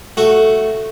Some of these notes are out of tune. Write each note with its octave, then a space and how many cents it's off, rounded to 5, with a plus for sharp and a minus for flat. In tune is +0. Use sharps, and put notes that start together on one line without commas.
A3 +0 F#4 +0